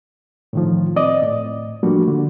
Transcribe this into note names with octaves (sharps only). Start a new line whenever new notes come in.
A2 D#3 F3
C4 D5 D#5
A2
F3 G3 A3 A#3 D4 F#4
D3